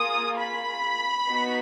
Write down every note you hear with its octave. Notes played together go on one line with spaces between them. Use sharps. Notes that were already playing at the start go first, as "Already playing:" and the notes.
Already playing: A#3 F4 G#4 D#6
B5
B3 D#4 F#4